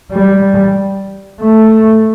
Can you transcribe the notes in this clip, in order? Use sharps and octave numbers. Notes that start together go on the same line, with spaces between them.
G3
A3